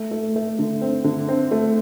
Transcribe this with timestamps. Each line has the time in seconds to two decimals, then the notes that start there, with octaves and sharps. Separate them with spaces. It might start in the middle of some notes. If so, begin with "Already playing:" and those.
Already playing: A3
0.11 A3
0.36 A3
0.59 D3
0.82 C4
1.04 D3
1.28 C4
1.51 A3